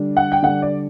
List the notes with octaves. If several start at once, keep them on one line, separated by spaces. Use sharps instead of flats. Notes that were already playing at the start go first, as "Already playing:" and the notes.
Already playing: D3 G3 D4
F#5
G5
D3 G3 D4 F#5
D5